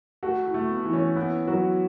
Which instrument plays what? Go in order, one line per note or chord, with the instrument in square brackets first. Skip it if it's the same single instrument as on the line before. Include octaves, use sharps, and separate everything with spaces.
[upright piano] A3 [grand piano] F#4
[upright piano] E4
[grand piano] A3
[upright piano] B3
[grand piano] E3
[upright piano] C#4
[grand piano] B3 [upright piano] E4
[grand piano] F#3 [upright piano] F#4